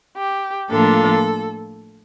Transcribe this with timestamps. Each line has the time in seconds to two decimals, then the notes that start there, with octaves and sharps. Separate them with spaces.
0.17 G4
0.70 A2 F3 A#3 D4 F4 A4